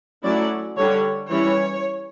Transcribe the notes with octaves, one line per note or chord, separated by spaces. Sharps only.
F#3 A3 C#4 E4 D5
D3 G3 D4 C#5
E3 G3 C#4 E4 C#5